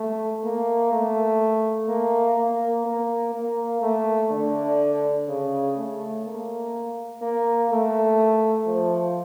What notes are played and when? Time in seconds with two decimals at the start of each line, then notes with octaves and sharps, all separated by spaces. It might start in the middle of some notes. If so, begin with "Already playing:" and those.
Already playing: A3
0.44 A#3
0.92 A3
1.88 A#3
2.38 A#3
2.86 A#3
3.34 A#3
3.82 A3
4.31 D3
5.28 C#3
5.77 A3
6.25 A#3
7.22 A#3
7.70 A3
8.66 F3